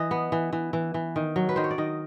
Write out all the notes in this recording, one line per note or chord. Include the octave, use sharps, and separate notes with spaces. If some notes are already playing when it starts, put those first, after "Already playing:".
Already playing: E3 D#5
B3
E3
E3
E3
E3
D#3
F#3
B4
D#3 C5
C#5
D5
D#3 D#5